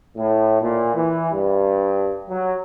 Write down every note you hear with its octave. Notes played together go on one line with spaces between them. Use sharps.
A2
A#2
E3
G2
F#3